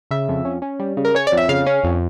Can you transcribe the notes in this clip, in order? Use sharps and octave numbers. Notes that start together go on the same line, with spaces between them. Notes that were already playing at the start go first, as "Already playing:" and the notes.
C#3 E5
F2
C#4
C#4
G3
C#3
A#4
C#4 C#5
D5
F2
E5
C#3 F5
C#4
F2